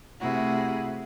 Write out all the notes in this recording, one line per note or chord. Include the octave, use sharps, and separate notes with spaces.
C3 A3 E4 F#4 G#4